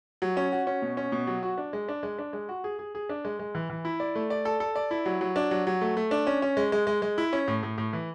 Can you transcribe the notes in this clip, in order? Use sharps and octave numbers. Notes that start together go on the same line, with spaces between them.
F#3
C#4
F#4
C#4
B2
C#4
B2
F#3
F#4
D4
G#3
D4
G#3
D4
G#3
F#4
G#4
G#4
G#4
D4
G#3
G#3
E3
E3
E4
D5
A3
D5
A4
A4
D5
E4
F#3
F#3
D4
F#3
F#3
A3
A3
D4
C#4
C#4
G#3
G#3
G#3
G#3
E4
C#4
A2
A2
A2
E3